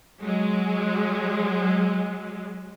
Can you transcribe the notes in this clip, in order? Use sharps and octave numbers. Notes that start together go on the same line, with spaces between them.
F#3 G#3